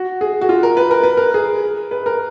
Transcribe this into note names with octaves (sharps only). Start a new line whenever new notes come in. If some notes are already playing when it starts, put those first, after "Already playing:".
Already playing: F#4
G#4
F#4
F4
A#4
B4
A#4
B4
A#4
G#4
B4
A#4